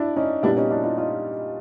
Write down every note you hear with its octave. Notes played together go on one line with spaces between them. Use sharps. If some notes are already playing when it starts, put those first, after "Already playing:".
Already playing: D4 E4
C#4 D#4
A#2 G3 B3 D4 E4
C#4 D#4
D4 E4
D#4 F4
D#4 F4